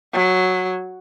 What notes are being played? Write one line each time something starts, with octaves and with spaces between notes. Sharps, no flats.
F#3